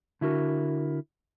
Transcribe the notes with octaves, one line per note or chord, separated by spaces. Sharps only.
D3 E4 F#4 A#4